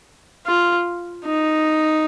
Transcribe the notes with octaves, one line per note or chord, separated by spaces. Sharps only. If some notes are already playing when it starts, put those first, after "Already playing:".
F4
D#4